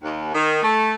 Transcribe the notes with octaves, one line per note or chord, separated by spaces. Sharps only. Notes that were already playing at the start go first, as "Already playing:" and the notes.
D#2
D#3
A3